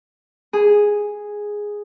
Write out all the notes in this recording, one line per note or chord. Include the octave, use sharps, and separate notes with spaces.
G#4